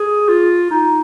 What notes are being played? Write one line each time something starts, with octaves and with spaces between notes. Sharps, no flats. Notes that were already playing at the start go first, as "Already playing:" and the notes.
Already playing: G#4
F4
D#4